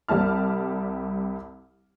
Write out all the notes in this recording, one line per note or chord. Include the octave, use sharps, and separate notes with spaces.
C2 G3 A5 F6